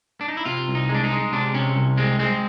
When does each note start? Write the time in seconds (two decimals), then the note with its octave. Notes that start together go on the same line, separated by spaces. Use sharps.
0.21 D4
0.28 D#4
0.37 E4
0.45 C3 F4
0.68 C2
0.75 D#4
0.89 G#3
0.95 D4
1.04 D#4
1.11 G#3
1.32 C3 D4
1.54 C3 C#4
1.76 C2
1.97 G#3 C4
2.19 G#3 C4